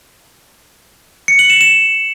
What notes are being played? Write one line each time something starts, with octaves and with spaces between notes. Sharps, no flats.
C#7
F#7
E7
E7